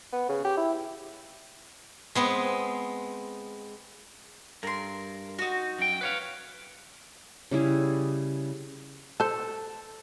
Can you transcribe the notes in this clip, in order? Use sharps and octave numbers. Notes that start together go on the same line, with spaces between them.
B3
C#3
G4
E4
G#3 B3 C4
G2 A#4 C6
D#4 F#4
F#2 G5
B4 C#5 F5
C#3 G3 E4 G#4
A4 C5 A5